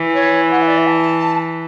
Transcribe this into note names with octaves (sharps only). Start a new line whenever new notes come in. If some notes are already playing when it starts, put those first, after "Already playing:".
Already playing: E3
C#5
F#5
E5
D5
E5
A5